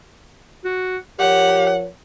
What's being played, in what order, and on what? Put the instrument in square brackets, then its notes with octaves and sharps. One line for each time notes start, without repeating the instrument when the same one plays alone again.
[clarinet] F#4
[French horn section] F3 A#4 C#5 [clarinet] G4 [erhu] F#5